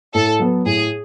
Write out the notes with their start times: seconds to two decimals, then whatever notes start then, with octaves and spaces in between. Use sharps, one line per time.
0.14 A2 A4
0.39 F#3 B3
0.66 A2 G#4